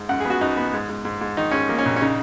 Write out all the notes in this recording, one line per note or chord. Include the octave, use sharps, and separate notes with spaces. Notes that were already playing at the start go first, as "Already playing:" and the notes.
Already playing: G#2
F#2 F#5
B3 G#4
F#4
F#2 D#4
B3
G#2
G#2
G#2
G#2
D#3 D#4
G#2 C#4
A#3
C#4
A#1
C#4
C#3 D#4